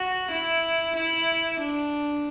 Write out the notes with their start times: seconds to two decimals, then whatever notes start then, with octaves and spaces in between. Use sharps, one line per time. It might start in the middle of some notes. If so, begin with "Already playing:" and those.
Already playing: F#4
0.31 E4
0.96 E4
1.60 D4